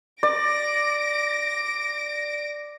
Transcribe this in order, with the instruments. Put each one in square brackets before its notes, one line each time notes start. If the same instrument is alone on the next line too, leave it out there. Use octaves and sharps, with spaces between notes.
[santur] D5 [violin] A#6 D7